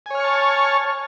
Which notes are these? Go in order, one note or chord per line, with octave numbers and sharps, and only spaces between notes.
C#5 G#5 A5 C#6 F6